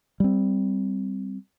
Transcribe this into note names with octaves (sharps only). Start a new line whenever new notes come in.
G3 C4